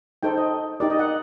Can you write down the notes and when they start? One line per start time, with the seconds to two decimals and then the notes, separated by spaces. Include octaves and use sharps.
0.23 D#4 A4 C5 G5
0.37 D#5
0.80 D#4 G4 A#4 D5
0.90 D#5
0.99 F#5